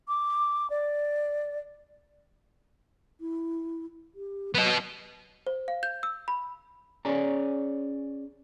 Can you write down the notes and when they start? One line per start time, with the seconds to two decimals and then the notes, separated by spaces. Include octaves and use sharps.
0.08 D6
0.70 D5
3.21 E4
4.15 G4
4.54 F#3 B3 D#5
5.47 C5
5.68 F5
5.83 G6
6.03 E6
6.28 B5
7.05 C#4 G#4 C#5 D5 G#5 A#5